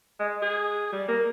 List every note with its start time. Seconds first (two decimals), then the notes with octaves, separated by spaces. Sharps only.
0.20 G#3
0.42 G#4
0.93 G3
1.08 A#3